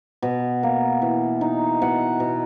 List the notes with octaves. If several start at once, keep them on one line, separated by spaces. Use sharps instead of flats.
B2
A#3
E3
D#4
B2 F#5
B2